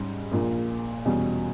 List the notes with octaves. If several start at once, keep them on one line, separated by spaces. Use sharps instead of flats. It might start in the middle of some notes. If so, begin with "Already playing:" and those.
Already playing: G#2 G3 C#4
A#1 A#2 A#3
E2 B2 G3 C#4